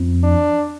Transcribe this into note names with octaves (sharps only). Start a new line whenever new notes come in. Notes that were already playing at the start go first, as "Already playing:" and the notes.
Already playing: F2
D4